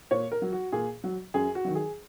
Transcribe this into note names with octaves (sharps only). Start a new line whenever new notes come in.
A#2 C#5
A#4
F#3
F#4
A#2 G#4
F#3
F#2 G#4
F#4
D#3 F#3
G#4